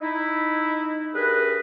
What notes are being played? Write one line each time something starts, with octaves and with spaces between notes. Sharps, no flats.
D#4 E4
G2 G#4 A#4 B4